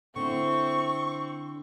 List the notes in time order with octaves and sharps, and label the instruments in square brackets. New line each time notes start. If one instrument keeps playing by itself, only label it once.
[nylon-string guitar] D3 E4 [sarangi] C4 [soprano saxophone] C#6